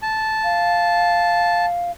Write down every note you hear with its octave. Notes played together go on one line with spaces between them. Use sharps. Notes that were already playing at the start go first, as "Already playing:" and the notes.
A5
F5